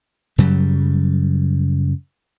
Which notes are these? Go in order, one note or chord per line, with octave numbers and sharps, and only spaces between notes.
F#2 C#3 F#3 G3